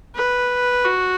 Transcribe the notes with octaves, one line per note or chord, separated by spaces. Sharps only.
B4
F#4